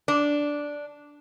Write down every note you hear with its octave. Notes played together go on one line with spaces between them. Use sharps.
D4